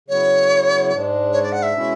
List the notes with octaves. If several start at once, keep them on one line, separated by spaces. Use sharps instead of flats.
C#3 F#3 B3 E4 C#5
G#2 G#3 D4
C#5
D5
F#5
E5
B2 G#3 C#4 E4